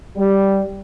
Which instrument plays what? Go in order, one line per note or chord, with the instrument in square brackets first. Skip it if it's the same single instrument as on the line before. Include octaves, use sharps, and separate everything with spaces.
[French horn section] G3